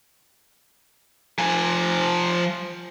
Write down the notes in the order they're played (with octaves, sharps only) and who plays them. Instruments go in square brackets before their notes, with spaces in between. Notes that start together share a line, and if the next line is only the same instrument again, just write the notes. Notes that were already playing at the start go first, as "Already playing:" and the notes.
[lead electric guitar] F3 G#5